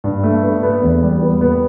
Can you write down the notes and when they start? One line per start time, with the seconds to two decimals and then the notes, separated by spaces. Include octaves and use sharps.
0.04 G2
0.23 A3
0.43 B3
0.63 B3
0.83 E2
1.03 G3
1.22 B3
1.41 B3